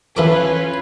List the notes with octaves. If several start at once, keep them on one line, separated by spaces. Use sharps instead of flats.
E3 C#4 F4 A4 B4 D6